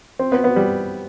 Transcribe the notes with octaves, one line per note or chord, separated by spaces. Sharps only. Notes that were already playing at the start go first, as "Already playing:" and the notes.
C4
B3
B3
G3